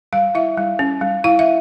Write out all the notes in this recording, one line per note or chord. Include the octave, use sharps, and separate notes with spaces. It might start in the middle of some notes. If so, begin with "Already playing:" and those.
G3 F5
E4 E5
G3
C#4
G3
E4 F5
E5